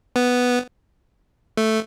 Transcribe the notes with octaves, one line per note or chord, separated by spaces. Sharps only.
B3
A3